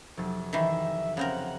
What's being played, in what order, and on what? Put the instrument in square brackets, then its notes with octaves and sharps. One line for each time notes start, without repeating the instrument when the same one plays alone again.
[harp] F1 F#3 A6
[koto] D#3 E3 [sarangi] E5
[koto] C#3 C4 A#4 [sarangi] F#5